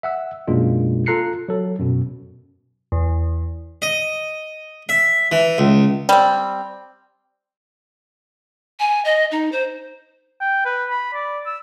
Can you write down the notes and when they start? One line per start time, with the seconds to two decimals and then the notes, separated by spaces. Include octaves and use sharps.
0.03 E5 F#5 E6
0.48 F#2 B2 G#3 A#3 D4 F4
1.06 F4 A4 A#5 F#6 C7 C#7
1.49 F#3 A4
1.79 F#2 B2
2.92 E2
3.82 D#5
4.89 E5
5.32 E3
5.58 C#2
6.09 G3 C4
8.79 G#5
9.04 D#5
9.31 D#4
9.52 C5
10.41 G5
10.65 B4
10.90 B5
11.14 D5
11.46 E6